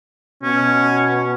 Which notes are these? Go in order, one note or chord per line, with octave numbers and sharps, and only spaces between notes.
B2 C#4